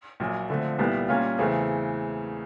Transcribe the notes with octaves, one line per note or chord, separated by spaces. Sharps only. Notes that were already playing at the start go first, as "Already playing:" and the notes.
A#1 A#2 F#3
D3 F3 A3 C4
C2 A#2 G3 B3
A#2 G3 A#3 C#4 F4
E2 C#3 E3 A3 C4